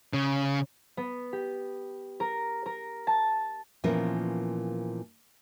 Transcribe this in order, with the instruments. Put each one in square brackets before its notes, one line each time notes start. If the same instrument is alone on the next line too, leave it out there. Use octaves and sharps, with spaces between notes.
[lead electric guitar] C#3
[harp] B3
G4
A#4
A#4
A5
[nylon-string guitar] A#2 E3 F3 B3 C#4 A#4